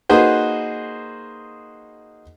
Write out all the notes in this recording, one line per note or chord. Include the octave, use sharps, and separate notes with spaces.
A#3 D#4 F#4 G#4 B4 C5